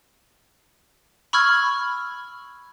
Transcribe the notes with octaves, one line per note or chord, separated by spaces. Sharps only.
B5 C#6 E6 F6 G#6